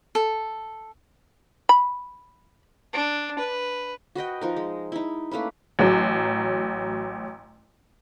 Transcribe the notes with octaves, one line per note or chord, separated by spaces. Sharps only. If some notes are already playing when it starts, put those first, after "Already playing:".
A4
B5
D4
B4
F#4 B4 D#5 G5
F3 D#4 A#4
G#3
D#4 E4
A3 A#3 C#4 B4
A1 F#3